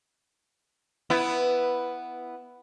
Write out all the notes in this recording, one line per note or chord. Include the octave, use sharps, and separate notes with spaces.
B3 E4